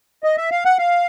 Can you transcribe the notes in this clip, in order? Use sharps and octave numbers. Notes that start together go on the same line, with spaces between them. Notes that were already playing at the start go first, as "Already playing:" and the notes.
D#5
E5
F5
F#5
F5